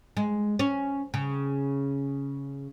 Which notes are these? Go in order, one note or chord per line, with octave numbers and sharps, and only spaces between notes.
G#3
C#4
C#3